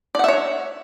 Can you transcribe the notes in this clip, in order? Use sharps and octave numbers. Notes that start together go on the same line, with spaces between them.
C#5 D5 E5 F#5